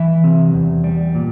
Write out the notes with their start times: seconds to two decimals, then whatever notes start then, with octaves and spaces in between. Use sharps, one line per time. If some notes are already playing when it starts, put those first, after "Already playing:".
Already playing: E3 E5
0.24 C3
0.54 E2
0.84 G3
1.15 A#2